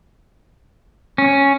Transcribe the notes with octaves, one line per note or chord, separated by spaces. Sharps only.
C#4